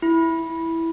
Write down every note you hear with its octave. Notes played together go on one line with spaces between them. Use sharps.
E4